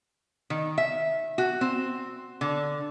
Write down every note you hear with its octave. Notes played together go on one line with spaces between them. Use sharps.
D#3
E5
F#4
C4
D3